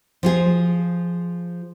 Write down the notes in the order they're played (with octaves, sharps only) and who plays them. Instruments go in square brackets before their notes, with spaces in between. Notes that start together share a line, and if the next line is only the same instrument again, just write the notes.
[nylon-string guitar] F3 F4 G#4